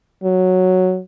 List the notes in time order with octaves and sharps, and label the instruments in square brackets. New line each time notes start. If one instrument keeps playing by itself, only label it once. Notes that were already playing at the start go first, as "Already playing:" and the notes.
[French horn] F#3